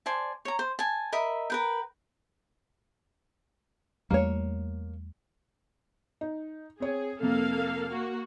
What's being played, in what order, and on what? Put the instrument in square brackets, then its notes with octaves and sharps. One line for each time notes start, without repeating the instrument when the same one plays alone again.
[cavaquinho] C5 D5 G#5 A5
C#5 A#5
C5
G#5 A5
A#4 D#5 E5 B5
A#4 B4 G5
[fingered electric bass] E2 G3 A3 [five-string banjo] A#3 C#5
[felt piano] D#4
[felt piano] C4 C#5 [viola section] G#4
[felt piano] F2 C3 [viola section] A#3 A4 F5
[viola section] A#3 F#4